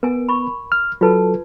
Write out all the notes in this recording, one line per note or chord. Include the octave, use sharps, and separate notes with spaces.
B3 A#4 G#5
B5 C#6
F6
F#3 F4 A4 B4 A5